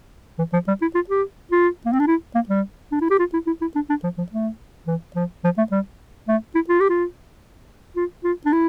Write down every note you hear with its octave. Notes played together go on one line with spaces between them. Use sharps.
E3
F3
G3
E4
F4
G4
F4
A#3
C4
D4
E4
A#3
G3
D4
E4
G4
F4
E4
E4
E4
D4
D4
F3
F3
A3
E3
F3
F3
A3
G3
A3
E4
F4
G4
F4
F4
F4
D4
E4